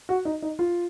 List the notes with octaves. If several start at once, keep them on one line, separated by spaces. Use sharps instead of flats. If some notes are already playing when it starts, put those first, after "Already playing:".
F#4
D#4
D#4
F4